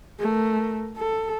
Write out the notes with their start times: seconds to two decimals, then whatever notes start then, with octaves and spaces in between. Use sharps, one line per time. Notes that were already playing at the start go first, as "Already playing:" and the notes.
0.19 A3 A#4
0.97 A4